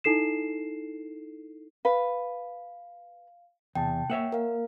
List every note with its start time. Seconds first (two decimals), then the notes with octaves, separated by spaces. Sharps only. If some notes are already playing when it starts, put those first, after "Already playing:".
0.04 D#4 E4 A4 C7 E7
1.85 B4 F5
3.75 E2 C3 G5 A5
4.10 A#3 C#5 E5 F#5
4.32 A#4 F5